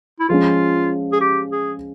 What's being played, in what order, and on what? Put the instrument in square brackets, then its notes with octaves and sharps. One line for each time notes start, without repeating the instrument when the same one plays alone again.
[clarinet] E4
[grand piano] F3 G#3 C#4 [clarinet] F4
[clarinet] G#4
G4
G#4